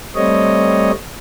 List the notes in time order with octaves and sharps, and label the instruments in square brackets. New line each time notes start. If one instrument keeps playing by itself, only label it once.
[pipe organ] G3 A3 C4 C#5 D#5